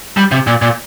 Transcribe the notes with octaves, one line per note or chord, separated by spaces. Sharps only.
G3
C3
A#2
A#2